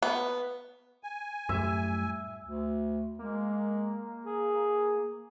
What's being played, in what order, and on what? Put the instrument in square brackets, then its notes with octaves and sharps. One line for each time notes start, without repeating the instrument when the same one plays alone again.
[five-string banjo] B3
[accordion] G#5
[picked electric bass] F#2 A2 G3 [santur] E5
[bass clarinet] D2
[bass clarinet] G#3 [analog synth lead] A#3
[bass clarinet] G#4